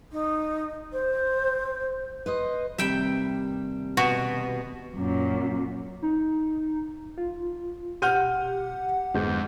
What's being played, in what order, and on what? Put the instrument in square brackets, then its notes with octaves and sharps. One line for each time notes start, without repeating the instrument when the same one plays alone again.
[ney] D#4
C5
[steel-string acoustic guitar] B4 C5 D#5
[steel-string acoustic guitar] D#2 C3 G3 [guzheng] E5 G5 B5
[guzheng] B2 [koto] F#4
[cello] F#2 A#2
[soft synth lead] D#4
[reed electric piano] F4
[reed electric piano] B2 [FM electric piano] G4 F#5 [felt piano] F6 G6 D#7
[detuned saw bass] F2 [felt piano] G#2 [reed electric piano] D3 B3 G6